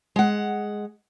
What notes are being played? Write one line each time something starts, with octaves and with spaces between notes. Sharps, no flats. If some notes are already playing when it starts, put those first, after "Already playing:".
G#3 F#5